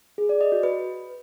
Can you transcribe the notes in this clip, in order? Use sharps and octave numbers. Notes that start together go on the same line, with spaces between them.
G#4
D5
D#5
F#4
B4